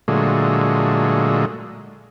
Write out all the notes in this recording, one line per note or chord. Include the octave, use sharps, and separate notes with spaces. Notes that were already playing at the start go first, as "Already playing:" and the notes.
A#2 D3 F#3 G#3 A3